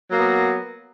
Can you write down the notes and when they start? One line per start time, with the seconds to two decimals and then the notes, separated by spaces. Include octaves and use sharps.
0.08 F#3
0.12 A#3
0.17 B3